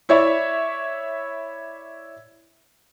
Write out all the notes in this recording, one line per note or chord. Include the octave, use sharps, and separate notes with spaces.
E4 C#5 D5 E5